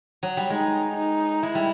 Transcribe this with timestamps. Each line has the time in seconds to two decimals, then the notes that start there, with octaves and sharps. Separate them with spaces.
0.23 F#3
0.37 G3
0.50 G#3 D#4
0.96 D#4
1.43 G#3 E4
1.55 G3